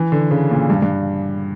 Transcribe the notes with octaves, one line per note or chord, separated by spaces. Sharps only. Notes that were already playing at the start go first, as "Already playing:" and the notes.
Already playing: E3
D3
C#3
A#2
G2
G2